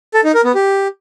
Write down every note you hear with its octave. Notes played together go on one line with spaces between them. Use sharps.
A4
D#4
A#4
B3
G4